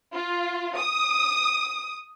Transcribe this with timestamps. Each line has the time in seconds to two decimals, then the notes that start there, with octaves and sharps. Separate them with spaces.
0.13 F4
0.78 D#6